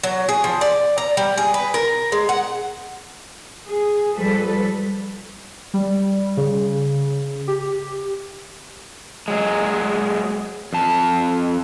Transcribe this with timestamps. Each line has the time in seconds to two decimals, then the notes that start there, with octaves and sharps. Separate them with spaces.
0.03 F#3
0.29 G#4
0.44 F3
0.61 D5
0.98 A#5
1.17 G3
1.37 G#4
1.54 B4
1.74 A#4
2.12 G#3
2.29 F#5
3.66 G#4
4.15 F3 G3 A4 B4
5.74 G3
6.37 C#3
7.48 G4
9.28 F#3 G#3
10.73 F2 A5